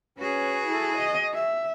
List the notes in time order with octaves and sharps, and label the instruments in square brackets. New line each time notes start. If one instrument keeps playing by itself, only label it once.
[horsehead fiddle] C#4 B4 [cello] F#4 G#4
[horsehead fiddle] E4 A4
D#5
E5